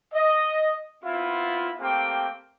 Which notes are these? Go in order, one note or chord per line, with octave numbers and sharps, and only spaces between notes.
D#5
B3 C4 E4 F4
A3 A#3 C4 G4 F5 G5